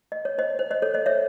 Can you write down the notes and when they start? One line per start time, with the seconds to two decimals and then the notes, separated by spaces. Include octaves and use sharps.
0.12 D#5
0.25 C#5
0.38 C5 D#5
0.59 C5
0.70 C5 D#5
0.82 A4 C#5
0.94 C5 D#5
1.06 C#5 E5